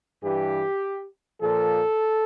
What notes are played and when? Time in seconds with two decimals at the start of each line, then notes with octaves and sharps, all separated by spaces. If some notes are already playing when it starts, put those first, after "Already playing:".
0.24 G2 E3 G4
1.41 A#2 F3 A4